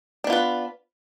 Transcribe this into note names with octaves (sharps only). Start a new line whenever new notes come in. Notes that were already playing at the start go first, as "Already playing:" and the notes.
B3 D4 F4 B4